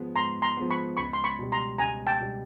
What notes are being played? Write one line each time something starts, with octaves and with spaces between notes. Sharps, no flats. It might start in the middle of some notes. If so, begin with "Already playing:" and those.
Already playing: G#2 F3 G#3 B3
G#2 A#5 C6
A#5 C6
F3 G#3 B3
B5 C#6
C#2 B5 C#6
C6
B5 C#6
B2 G3
A#5 C6
C#2 G#5 A#5
G5 A5
B2 G3